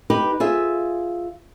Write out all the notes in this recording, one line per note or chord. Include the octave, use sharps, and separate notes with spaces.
D#4 G4 B4
F4 G#4 E5